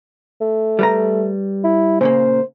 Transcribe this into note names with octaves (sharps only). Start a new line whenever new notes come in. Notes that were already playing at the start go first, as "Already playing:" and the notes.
A3
G3 B4 A#5
E4
A#2 C#3 A#3 C5